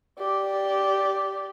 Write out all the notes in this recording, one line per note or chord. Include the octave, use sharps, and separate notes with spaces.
G4 D5